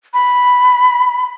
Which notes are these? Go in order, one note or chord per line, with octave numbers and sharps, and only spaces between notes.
B5